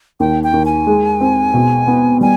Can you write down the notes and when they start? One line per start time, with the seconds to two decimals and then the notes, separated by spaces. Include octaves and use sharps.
0.20 D#2 G5
0.44 G5
0.53 D#2
0.65 G#5
0.87 G#3
1.21 C4
1.54 B2
1.87 B3
2.21 G3 G#5